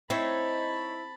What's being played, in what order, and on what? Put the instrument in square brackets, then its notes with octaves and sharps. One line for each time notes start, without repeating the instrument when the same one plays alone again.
[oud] C4 [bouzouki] D#4 C#5 [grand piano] E4 [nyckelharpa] A5 B5